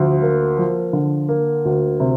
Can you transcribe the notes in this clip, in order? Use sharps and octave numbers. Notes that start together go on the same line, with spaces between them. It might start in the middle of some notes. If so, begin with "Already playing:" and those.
Already playing: D2 F3
A#3
F3
D3
A#3
D2
C3